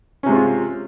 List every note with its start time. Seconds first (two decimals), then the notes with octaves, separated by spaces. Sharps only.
0.23 C#4
0.26 C3
0.29 G#3
0.32 C4
0.35 F4